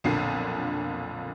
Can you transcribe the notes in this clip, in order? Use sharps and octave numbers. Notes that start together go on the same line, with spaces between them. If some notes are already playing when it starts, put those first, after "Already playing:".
B1 F2 A#2 D3 C7